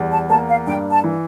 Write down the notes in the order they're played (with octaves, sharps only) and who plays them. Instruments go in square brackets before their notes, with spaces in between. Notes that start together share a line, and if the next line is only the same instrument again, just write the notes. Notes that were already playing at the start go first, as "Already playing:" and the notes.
Already playing: [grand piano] E2 G3
[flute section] A5
[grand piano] A#3 [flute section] A5
[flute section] F5
[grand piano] G2 [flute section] G5
[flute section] A5
[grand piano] E3